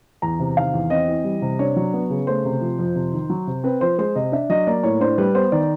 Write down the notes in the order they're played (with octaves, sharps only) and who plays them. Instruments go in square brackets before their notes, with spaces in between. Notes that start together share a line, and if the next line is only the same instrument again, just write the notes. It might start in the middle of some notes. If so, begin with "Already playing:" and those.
[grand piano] E2 A#5
C3
D#3 F5
E2
C4 D#5
E3
G3
C3
D4 C#5
F#3
B3
C#3
A3 C5
C3
F3
F2
C3
D#3
F#3
C3
C4 B4
F3 C5
G#3 C5
C3 D#5
D4 E5
F#3 D#5
A#3 D5
A2 C#5
D4 C5
G3 B4
B3 C5
D#3 D5